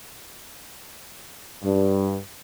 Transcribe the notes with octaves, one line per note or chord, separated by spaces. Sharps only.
G2